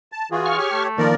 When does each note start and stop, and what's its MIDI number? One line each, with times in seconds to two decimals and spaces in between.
0.12 0.29 81
0.31 0.57 52
0.31 0.57 65
0.31 0.57 66
0.31 0.70 68
0.46 0.84 85
0.46 0.84 89
0.57 0.88 67
0.57 0.88 73
0.72 1.07 57
0.98 1.15 51
0.98 1.15 53
0.98 1.15 58
0.98 1.15 70
0.98 1.15 74